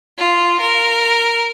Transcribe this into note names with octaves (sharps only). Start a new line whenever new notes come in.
F4
A#4